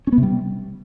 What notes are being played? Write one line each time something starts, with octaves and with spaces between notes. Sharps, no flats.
C#4
B3
C3
G3